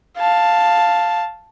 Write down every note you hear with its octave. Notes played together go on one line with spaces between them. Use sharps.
F5 A5